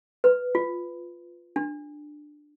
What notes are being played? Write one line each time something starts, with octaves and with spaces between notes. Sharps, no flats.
B4
F4
D4